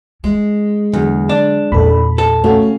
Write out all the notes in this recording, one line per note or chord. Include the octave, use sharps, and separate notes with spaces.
G#3 C#4
E2 D3 F#3
D4
A#1 E2 A4 B5
A4
C#3 A3 C#4 F#4